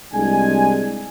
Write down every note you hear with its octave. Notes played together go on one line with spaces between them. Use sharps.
C2 G#3 D4 G#5